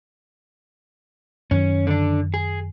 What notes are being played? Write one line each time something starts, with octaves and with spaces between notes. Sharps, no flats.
F#2 D#3 F#3 C#4
D3 D4
G#4